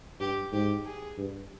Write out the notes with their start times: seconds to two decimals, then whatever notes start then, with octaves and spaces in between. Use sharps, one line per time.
0.20 G2 G4
0.52 G#2 G4
0.85 G#4
1.18 G2